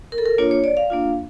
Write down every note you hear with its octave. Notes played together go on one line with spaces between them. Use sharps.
A#4
A4
A#4
A#3 D4 F4 C#5
C#5
D5
F5
A#3 D4 F4